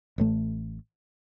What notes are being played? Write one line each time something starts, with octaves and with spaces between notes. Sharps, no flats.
A1 A2 A3